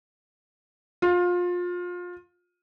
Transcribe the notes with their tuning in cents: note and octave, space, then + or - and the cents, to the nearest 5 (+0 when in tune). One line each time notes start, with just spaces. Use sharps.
F4 +25